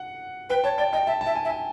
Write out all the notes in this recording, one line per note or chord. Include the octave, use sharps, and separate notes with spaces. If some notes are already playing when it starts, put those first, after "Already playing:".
Already playing: F#5
B4 G5
C#5 A5
D5 G5
D#5 G5
E5 A5
E5 A5
G#5
E5
G#5